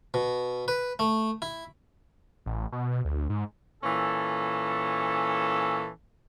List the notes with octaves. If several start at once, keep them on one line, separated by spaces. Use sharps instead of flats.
B2
B4
A3
E4
A1
B2
D2
G#2
A#2 E3 C#4 A4